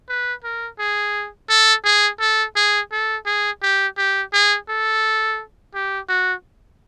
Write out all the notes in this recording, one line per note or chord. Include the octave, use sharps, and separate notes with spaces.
B4
A#4
G#4
A4
G#4
A4
G#4
A4
G#4
G4
G4
G#4
A4
G4
F#4